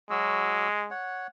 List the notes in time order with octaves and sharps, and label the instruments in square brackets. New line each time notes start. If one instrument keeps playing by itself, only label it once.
[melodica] F#3 F#4 E6 [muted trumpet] G#3
[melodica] C#5 F#5